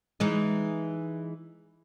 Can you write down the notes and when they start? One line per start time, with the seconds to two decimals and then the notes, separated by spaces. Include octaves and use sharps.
0.20 E3 G#3 D#4